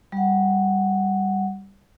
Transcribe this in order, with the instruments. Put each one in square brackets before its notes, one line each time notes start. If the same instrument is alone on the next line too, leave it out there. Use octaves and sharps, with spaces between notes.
[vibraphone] G3 F#5